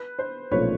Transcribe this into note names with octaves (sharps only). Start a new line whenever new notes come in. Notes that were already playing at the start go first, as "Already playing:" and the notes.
Already playing: B4
C5
B1 A#2 F3 A3 C#4 B4 C#5